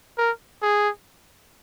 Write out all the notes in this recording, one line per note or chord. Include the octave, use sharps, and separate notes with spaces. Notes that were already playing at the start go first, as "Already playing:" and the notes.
A#4
G#4